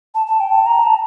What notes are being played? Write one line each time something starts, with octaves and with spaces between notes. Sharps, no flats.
A5
A5
G5
A5
A#5
A5